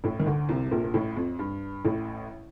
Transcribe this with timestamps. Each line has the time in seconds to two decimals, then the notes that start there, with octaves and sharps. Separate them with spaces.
0.04 A1 A2
0.20 D#3
0.27 D2 D3
0.49 C2 C3
0.66 C3
0.71 A#1 A#2
0.84 A#2
0.94 A1 A2
1.16 F2
1.39 G2
1.85 A1 A2